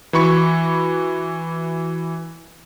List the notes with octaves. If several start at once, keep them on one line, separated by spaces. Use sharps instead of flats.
E3 F#4 B5 C#6 C#7